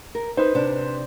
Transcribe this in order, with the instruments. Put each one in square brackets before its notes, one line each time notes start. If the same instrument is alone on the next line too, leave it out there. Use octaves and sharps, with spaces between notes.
[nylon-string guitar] A#4
[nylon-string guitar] D#4 [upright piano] B4 C5
[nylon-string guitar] C3 D4